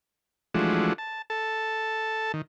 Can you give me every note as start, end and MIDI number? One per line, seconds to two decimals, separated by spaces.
0.54 0.93 52
0.54 0.93 53
0.54 0.93 56
0.54 0.93 57
0.54 0.93 62
0.54 0.93 66
0.98 1.22 81
1.30 2.32 69
1.30 2.32 81
2.34 2.41 51